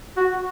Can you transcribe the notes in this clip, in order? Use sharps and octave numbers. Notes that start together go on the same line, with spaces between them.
F#4